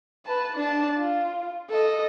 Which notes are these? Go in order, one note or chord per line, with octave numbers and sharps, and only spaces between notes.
B4 A5
D4 A5
F4
A4 D#5